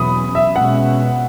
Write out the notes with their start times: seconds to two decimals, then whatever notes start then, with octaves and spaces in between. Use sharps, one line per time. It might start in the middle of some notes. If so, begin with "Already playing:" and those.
Already playing: E2 B2 F#3 C#4 B5 D#6
0.35 E5
0.55 B2 G#3 C#4 F#5